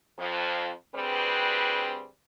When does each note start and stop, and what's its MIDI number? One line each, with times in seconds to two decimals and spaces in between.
0.19 0.71 41
0.19 0.71 53
0.94 2.06 38
0.94 2.06 55
0.94 2.06 60
0.94 2.06 68
0.94 2.06 71